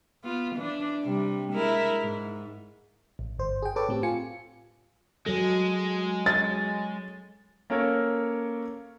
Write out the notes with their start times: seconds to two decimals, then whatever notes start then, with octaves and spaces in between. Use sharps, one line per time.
0.24 B3 F4
0.55 E3 D4
1.03 C3 G3
1.52 G#3 E4 A#4
2.01 G#2
3.19 A1
3.38 G1 C5
3.62 G#4 G5
3.76 A4 B4 C#5 A5 D6
3.89 A2 C4 G4
4.03 F4 G#5 C#7
5.26 F#3 G#3 A4
6.26 C#5 A6
7.70 A#3 C#4 A4 A#4 C#5